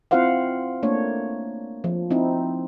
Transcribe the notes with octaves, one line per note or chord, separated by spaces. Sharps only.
C4 E4 F4 C5 F5 F#5
A3 A#3 D4 C#5
F3
C4 D#4 E4